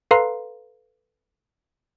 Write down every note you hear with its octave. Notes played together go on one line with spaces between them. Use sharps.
A4 B4 F5 A#5 C6 C7